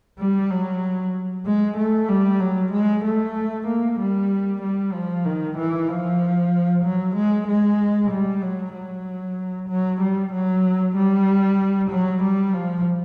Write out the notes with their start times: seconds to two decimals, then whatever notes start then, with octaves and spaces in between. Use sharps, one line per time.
0.19 G3
0.51 F#3
1.46 G#3
1.77 A3
2.09 G3
2.40 F#3
2.72 G#3
3.04 A3
3.67 A#3
3.99 G3
4.62 G3
4.93 F3
5.25 D#3
5.57 E3
5.89 F3
6.84 F#3
7.16 G#3
7.47 G#3
8.11 G3
8.42 F#3
8.73 F#3
9.69 F#3
10.01 G3
10.33 F#3
10.96 G3
11.90 F#3
12.23 G3
12.53 F3